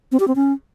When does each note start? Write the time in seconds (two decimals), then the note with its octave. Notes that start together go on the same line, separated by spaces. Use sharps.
0.12 C4
0.20 G4
0.28 C4
0.36 C#4